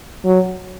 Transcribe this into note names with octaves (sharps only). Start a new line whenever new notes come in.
F#3